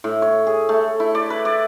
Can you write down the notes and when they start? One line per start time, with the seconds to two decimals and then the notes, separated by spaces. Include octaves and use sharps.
0.04 A2
0.22 C#5
0.47 G#4
0.69 A3
1.00 E4
1.15 D5
1.30 B4
1.45 D5